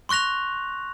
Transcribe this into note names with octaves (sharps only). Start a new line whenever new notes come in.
C6 C#6 F#6 A#6 F7